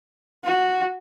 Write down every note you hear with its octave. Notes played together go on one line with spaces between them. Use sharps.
F#4